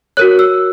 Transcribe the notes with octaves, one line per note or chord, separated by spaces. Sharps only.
F#4 A#4 C#5 F#6
E6